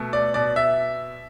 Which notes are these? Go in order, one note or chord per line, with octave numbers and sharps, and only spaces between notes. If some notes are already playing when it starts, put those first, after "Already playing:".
Already playing: B2 A3
D5
B2 D5
E5